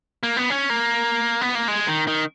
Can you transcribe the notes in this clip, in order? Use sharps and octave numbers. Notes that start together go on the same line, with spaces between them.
A#3
B3
C#4
A#3
B3
A#3
G#3
D#3
D#3